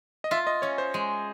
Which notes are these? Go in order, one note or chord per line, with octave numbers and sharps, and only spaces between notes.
D#5
F4 E5
D#5
C#4 C#5
C5
G#3